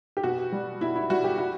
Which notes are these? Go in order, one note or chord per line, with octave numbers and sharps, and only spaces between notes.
G4
B2 F#4
G3
B2 E4
E4
G3 F#4
G4
F#4